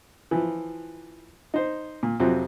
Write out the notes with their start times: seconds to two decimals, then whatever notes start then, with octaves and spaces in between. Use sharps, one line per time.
0.31 E3 F3
1.54 D#4 C5
2.03 A#2
2.20 F2 C3 F3 F#3